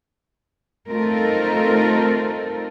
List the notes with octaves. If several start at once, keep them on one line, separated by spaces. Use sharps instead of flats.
A3 C4 D#4 F4 A4 A#4